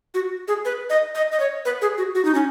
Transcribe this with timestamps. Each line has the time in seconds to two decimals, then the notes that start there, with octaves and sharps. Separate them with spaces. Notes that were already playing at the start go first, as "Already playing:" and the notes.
0.14 F#4
0.48 G#4
0.65 B4
0.90 D#5
1.15 D#5
1.32 D#5
1.40 C#5
1.65 B4
1.82 G#4
1.98 F#4
2.15 F#4
2.25 D#4
2.35 C#4